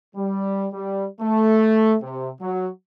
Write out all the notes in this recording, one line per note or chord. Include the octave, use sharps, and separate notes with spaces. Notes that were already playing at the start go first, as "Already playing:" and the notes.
G3
G3
A3
C3
F#3